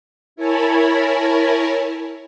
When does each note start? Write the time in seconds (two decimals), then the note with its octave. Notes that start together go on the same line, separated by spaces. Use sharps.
0.36 E4 A#4 C#5 G#5 A5 B5